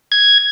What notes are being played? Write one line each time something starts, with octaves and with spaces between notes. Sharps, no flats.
G#6